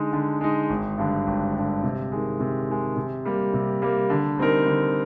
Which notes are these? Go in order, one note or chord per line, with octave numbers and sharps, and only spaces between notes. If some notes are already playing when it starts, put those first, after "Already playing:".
Already playing: D3 G#3 D#4
D3
G#3 D#4
G#1
G2 D3
G#1
G2 D3
C3
D#3 G#3
C3
D#3 G#3
C3
G3 A#3
C3
G3 A#3
D3
G3 C4 D#4 A#4
D3